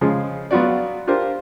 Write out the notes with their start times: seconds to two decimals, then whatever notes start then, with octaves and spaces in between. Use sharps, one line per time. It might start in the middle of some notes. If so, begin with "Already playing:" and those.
0.01 C#3 F3 G#3
0.51 F#3 B3 F4 F#4 D5
1.07 D4 F4 G4 A#4 C5